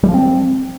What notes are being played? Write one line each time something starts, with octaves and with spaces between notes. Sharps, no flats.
G3
F3
C4